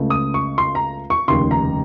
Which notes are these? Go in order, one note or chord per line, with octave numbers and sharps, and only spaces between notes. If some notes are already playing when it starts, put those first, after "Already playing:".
Already playing: C#2 C#3 A3
D#6
C#6
C6
A#5
C#6
F1 D#2 C#3 C6
A#5